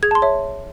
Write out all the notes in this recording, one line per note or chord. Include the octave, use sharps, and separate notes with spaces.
G#4 G#6
A5
C6
C#5 E5